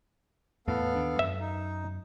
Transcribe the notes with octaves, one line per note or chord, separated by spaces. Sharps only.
E2 A2 E3 B3 A4 F5
D#2 D4
F#2 E5
D#4